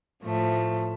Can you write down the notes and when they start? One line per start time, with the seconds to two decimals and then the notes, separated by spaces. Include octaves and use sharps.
0.24 A2 F3 A3